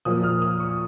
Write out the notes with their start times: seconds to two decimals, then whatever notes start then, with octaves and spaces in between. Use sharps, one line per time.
0.05 A#2 F3 A#3 D#6
0.23 F6
0.42 D#6
0.60 C#6